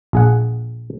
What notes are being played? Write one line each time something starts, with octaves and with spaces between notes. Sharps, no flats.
A#1 G#4 F#5